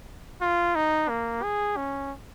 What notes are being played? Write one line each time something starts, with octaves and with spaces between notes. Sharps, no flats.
F4
D#4
A#3
G#4
C#4